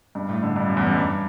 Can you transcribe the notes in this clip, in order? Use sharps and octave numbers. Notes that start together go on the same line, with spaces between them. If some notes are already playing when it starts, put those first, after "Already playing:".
G2
A2
D3
G2
F#2
E2
F#2
G2